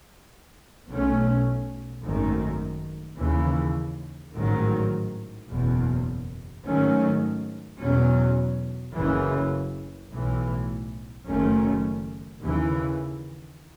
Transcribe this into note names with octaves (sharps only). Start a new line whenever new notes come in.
B1 B2 A3 C#4
G#1 F#2 D#3 A3
D#2 C#3 E3
A1 G#2 D#3 F#3
F#1 E2 B2
G#2 D#3 F#3 A3 C#4
E2 B2 F#3 C#4
F#1 F#2 C#3 E3
B1 A2 E3
F#1 F#2 D#3 A3 C#4
D#2 C#3 E3